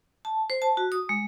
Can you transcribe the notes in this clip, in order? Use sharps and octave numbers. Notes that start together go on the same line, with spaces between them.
A5
C5
A5
F#4
D#6
G#3